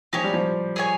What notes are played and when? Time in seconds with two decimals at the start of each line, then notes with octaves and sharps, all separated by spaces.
0.13 F3 D#4 G4 C#5 G#5
0.24 G3
0.34 F3
0.76 G#4 C#5 G#5